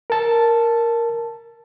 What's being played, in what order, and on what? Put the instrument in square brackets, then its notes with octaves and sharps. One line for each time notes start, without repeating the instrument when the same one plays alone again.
[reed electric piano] A#4 A5